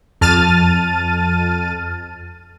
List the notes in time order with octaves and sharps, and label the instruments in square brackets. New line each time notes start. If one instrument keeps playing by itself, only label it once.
[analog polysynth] F2 A5 F6 A6 D#7